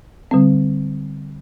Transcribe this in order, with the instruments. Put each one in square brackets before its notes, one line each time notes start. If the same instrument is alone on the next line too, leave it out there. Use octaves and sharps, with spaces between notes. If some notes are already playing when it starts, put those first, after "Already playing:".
[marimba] D3 G3 C4